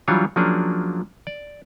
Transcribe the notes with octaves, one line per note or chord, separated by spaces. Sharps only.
E3 F#3 G3 D4 F4 C#5
F3 F#3 A#3 C#4 D4 G#4
D5